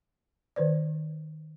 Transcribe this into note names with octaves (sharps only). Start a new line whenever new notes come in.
D#3 B4 C5 D5